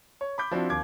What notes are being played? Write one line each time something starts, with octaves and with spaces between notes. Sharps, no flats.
C#5
B5 D6 G6
F3 C4 D4 E4 F#4
D#2 D6 G#6